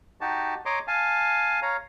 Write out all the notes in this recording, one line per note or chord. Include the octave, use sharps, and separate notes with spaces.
D#4 F#4 G4 A5
C#5 D#5 A#5 C6 D6
F5 G#5 A5
C#5 F5 A#5